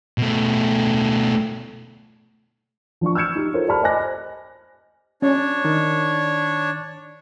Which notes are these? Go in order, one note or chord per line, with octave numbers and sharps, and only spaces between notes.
B2 A3
F3 D4 F4 C#6
E6 F6 G6 G#6 C#7 E7
D#4 G4
F4 A4 A#4 C5 C#5
G4 C5 D5 A5 B5 F6
C5 D#5 G#5 D6 F#6 A#6
C#4 D4 C#5
D#3